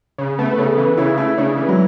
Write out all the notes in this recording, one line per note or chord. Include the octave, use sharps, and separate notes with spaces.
C#3
A3 B3
B4
C#3 A4
E3
C#3 E4
A3 E4
C#3 D4
E3
F#3